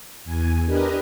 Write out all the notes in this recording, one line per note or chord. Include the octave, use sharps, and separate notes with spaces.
E2 G#5
D4 G4 A#4 B4 D#5